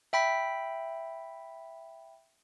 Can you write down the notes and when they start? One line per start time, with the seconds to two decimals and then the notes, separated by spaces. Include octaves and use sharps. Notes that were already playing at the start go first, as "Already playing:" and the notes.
0.13 E5 G5 B5 B6